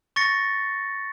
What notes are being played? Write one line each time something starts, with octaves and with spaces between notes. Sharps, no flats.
C#6 A6 A#6 C#7